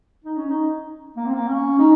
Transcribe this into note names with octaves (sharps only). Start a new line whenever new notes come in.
D#4
C#4
D#4
A#3
C4
A#3
C#4
D#4